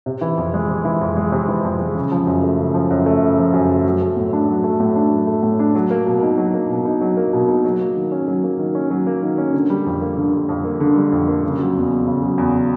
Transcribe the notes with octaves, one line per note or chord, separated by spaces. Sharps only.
C3
E3
F2
G#3
C3
E3
F2
G#3
C3
E3
F2
G#3
C#3
F3
F#2
A3
C#3
F3
F#2
A3
C#3
F3
F#2
A3
F#3
A3
A2
D4
F#3
A3
A2
D4
F#3
A3
A2
D4
F#3
A#3
B2
D#4
F#3
A#3
B2
D#4
F#3
A#3
B2
D#4
F#3
A#3
D#3
C#4
F#3
A#3
D#3
C#4
F#3
A#3
D#3
C#4
D3
G3
F2
A#3
D3
G3
F2
A#3
D3
G3
F2
A#3
C#3
F#3
E2
E2
C#3
F#3
E2